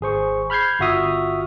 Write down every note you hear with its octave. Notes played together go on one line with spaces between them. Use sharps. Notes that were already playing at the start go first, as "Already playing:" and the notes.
G#1 G#4 C5 C#6
B5 F6 G6 G#6 C7
G1 F4 F#4 E5 D#6 F6